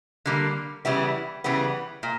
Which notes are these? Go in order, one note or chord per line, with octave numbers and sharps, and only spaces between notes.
D3 G3 A#3
C#3 E3 G3 B3 E4
C#3 E3 G3 B3
A#2